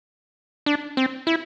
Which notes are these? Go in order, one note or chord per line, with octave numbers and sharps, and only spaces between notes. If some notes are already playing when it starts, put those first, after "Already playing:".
D4
C4
E4